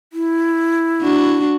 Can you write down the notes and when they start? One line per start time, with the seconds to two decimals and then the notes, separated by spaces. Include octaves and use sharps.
0.13 E4
1.02 D4 F#4